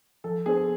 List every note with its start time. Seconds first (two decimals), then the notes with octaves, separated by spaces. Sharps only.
0.24 F3 A4
0.46 B3 D4 G#4 A4 C5